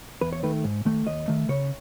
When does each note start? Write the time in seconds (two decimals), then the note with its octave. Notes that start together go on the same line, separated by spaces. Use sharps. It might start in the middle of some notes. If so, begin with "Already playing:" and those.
0.21 E2 B4
0.33 C#5
0.43 D#3 A3 B4
0.64 G#2
0.85 D#3 A3
1.07 D#2 D#5
1.28 D#3 A3
1.49 C#3 C#5